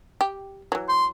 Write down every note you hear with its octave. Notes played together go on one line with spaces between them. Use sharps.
G4
E3 F#3
C6